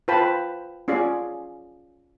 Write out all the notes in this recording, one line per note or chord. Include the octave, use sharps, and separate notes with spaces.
F4 B4 C5 G5 A5 B5
C#4 F4 G#4 D5